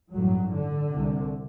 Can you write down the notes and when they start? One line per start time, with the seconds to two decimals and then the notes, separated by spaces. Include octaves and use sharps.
0.12 A1 G2 F#3
0.51 D3
0.91 C2 C3